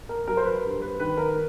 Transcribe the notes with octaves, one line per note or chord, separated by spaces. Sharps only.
A#4
F#3 A#4
C5
B4
G2
B4
D#3 B4
A#4